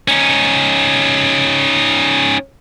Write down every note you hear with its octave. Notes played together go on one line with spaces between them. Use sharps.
C#4 D#4